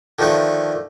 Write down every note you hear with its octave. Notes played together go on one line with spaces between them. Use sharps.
D3 D#3 F3 A3 B4